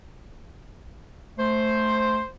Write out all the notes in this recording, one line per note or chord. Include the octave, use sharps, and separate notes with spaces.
A3 C5